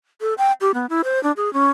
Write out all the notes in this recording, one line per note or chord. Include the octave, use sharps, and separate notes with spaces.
A4
G5
G4
B3
E4
C5
D4
G#4
C#4